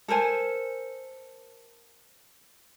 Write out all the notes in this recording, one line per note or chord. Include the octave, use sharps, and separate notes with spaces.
A4 A#4 C5 G#5